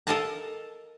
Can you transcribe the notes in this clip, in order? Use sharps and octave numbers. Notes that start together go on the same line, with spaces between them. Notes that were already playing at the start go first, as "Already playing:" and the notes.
A4 A#4 D#5 F5 A5 A#5